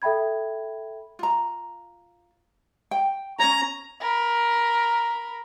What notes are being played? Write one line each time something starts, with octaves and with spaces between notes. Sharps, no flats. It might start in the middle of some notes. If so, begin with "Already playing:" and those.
A4 E5 G5 B5 G#6
F4 A#5
G5
C#4 D#4 C#5 A#5
A#4 B5